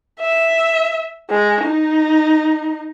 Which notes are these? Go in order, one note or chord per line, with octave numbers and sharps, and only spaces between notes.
E5
G#3
D#4